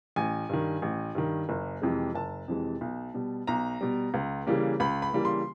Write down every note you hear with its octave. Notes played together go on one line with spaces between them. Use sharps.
A1 G#5
G2 D#3
A1
G2 D#3
F#1
F2 C3 E3 G#3
F#1 A5
F2 C3 E3 G#3
B1
B2 G3
B1 A#5
B2 G3
C#2
C#3 E3 G3 A#3
C#2 B5
B5
C#3 E3 G3 A#3
C6